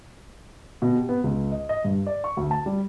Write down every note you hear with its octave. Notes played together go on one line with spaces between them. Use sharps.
B2
G4
B3
C#2
D#5
D#5
G2
D5
C#6
D2
A5
G3